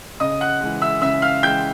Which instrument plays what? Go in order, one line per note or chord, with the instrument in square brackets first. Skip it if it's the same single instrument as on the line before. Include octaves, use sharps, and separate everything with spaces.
[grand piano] C#3 D#5 D#6
F#5 F#6
E3 G#3
E5 E6
C#3 E5 E6
F5 F6
E3 G#3 G5 G6